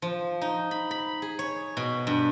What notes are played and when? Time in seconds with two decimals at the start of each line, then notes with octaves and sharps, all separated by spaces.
0.02 F3
0.41 D#4
0.71 B5
0.91 B5
1.22 G#4
1.39 C#5
1.77 B2
2.07 G2